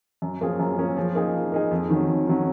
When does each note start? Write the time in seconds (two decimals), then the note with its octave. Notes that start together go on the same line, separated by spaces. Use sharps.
0.22 F#2
0.41 F3 A#3 C#4 G#4
0.59 F#2
0.78 F3 A#3 C#4 G#4
0.97 F3
1.15 A#3 D#4 G#4
1.34 F3
1.52 A#3 D#4 G#4
1.71 F2
1.90 D#3 F#3 C#4
2.09 F2
2.27 D#3 F#3 C#4